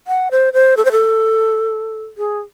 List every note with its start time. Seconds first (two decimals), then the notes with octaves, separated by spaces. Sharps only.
0.07 F#5
0.31 C5
0.53 C5
0.77 A4
0.85 C5
0.92 A4
2.18 G#4